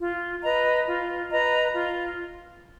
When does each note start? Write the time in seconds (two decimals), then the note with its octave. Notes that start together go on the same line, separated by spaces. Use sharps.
0.01 F4
0.44 B4 D#5 A#5
0.87 F4
1.31 B4 D#5 A#5
1.74 F4